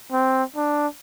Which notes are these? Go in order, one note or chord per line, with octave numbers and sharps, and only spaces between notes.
C4
D4